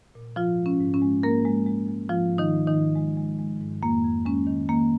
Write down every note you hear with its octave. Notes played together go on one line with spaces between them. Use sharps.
A#2
G#2 F3 F4
G#3
C#4
G#2
C#4
G#3
G#2 A#3 A#4
G#3
G#3
G#3
G#2 F3 F4
G#2
D#3 D#4
G#2
D#3 D#4
G#2
G#3
G#3
G#3
G#2
F2 A#3
F2
G#3 C#4
D#3
D#3 A#3